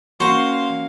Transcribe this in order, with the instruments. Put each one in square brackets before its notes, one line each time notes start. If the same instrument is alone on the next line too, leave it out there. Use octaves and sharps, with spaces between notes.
[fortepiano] A#3 F#4 [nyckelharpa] C#4 F5 [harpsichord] C5 [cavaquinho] C#6